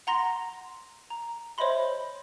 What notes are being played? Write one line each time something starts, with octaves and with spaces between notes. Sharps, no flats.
F#5 A#5 C6 A#6
A#5
C5 C#5 D#5 E5 B5 C6